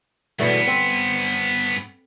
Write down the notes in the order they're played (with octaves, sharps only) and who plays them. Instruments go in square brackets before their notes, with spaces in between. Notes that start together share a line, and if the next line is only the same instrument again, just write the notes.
[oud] E2 B2 A3 [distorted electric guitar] G2 B3
[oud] C4